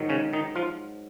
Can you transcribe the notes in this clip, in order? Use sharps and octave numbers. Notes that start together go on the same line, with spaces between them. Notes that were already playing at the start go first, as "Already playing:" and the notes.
Already playing: G#2 D#3 F#3
C#3 C#4
D#3 D#4
F3 F4